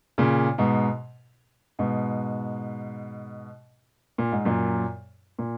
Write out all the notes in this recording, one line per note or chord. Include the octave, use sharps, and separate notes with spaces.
A#2 C#3
G#2 B2
G#2 B2
A#2
G#2
F#2 A#2
A#2